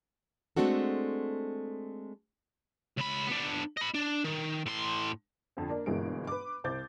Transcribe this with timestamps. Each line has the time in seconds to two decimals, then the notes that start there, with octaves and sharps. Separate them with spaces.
0.57 G#3 A3 C4 D4 F#4 A4
2.98 C#2 B5
3.28 B3 D4
3.77 D#5 B5
3.95 D4
4.25 D#3
4.66 A2 C6
5.57 F2 D3 C4
5.70 A#3 D4
5.86 G1 B2 E3 G#3 A#3 D7
6.27 B4 D6
6.64 C2 C5 D6 G6 A6